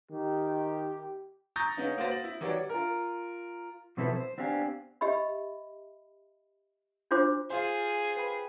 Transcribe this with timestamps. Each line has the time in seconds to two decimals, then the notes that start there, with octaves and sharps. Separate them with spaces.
0.11 D#3 G4
1.56 A#5 C#6 D#6 G6 A6 A#6
1.77 C#3 B3 C#4 D#4
1.98 A#3 F#4 B4 C5 A6 A#6
2.11 F#7
2.24 E4
2.41 D#3 E3 G3 F#4 C#5 D5
2.69 F4 A#4
3.97 B2 F3 C4 E4 A4 B4
4.16 C5
4.38 B3 C4 D4 G4 F5 G#5
5.01 G4 D#5 E5 B5
7.11 D4 F4 F#4 C5 D6
7.50 F4 G#4 C5 F5 G#5
8.17 B4 G5 B5